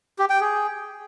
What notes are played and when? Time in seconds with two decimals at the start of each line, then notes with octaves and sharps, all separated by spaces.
0.19 G4
0.30 G5
0.41 G#4